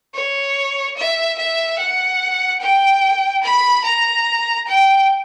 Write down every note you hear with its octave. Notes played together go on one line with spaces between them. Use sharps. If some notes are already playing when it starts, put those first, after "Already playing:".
C#5
E5
E5
F#5
G5
B5
A#5
G5